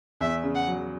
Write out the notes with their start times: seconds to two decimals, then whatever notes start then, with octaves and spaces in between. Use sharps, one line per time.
0.21 E2 E5
0.44 C#3
0.55 F#5
0.67 F#3